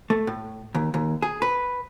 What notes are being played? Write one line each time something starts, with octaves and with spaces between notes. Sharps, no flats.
A3
A2
D#2
D#2
G#4
B4